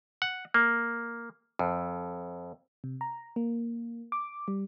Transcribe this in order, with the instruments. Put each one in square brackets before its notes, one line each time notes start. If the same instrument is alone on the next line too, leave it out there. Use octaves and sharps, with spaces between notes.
[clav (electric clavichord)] F#5
A#3
F2
[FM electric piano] C3
A#5
A#3
D6
G3